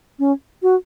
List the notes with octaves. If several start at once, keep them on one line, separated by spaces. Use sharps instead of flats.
C#4
F#4